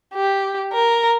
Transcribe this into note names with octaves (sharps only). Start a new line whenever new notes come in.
G4
A#4